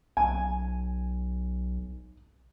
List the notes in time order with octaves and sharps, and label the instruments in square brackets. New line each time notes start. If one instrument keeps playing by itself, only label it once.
[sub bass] B1 [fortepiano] G#5